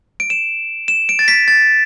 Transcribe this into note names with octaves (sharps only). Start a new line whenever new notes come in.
D7
E7
E7
D7
A6
B6
A6